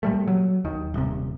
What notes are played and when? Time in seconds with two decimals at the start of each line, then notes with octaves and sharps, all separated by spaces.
0.03 A#2 G3 A3
0.28 F#3
0.65 D#2 D#3
0.94 D#1 C3